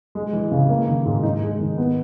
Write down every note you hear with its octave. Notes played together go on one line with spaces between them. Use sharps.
G#3
E3
C#3
A#3
D#3
G#2
D#4
G#3
D#3
B3